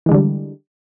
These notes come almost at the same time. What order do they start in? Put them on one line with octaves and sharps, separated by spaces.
E3 G#3 D3 G3